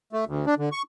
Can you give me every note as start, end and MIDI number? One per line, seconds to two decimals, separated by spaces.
0.13 0.25 57
0.27 0.46 38
0.46 0.55 62
0.58 0.69 50
0.72 0.82 85